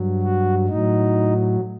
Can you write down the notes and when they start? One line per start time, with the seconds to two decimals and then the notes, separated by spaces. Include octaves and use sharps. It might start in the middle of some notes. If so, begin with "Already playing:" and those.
Already playing: G2 F#3
0.22 F#4
0.68 A2 F#3 D#4